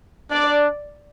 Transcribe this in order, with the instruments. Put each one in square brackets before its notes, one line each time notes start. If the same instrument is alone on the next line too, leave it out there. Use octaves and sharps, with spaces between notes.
[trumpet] D4 [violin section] D5